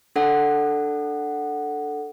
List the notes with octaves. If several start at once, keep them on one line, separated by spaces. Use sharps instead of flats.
D4 A4 F#5